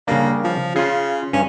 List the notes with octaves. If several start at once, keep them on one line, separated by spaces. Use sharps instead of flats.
C#3 G3 A#3 D4
F3
C#3 F4 G#4
G2 C#4